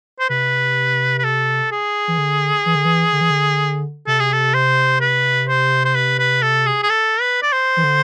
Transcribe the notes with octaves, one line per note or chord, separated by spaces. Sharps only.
C5
C3 B4
B4
A4
G#4
E3
D3
E3
D3
E3
D3
E3
D3
C3 A4
G#4
A4
C5
B4
C5
C5
B4
B4
A4
G#4
G#4
A4
B4
D5
C5
E3
D3